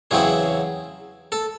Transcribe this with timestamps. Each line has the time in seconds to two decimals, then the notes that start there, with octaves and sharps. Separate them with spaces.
0.11 E2 C#3 F#3 C4 E4 G#4
1.32 A4